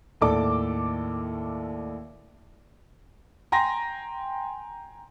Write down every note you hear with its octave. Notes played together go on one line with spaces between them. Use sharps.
D#2 A2 A4 D5 D6
G5 G#5 A#5 C6 A#6